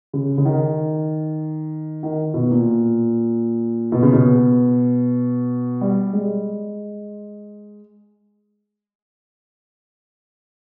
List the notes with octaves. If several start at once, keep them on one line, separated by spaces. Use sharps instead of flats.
C#3
C#3
D#3
D#3
B2
A#2
B2
C#3
B2
G3
G#3